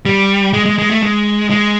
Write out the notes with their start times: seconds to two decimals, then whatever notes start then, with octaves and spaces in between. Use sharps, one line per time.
0.05 G3
0.53 G#3
0.66 G#3
0.78 G#3
0.90 A3
1.03 G#3
1.50 G#3